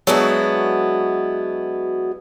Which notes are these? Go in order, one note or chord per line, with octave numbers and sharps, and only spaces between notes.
F#3 G#3 B3 D4 E4 F#4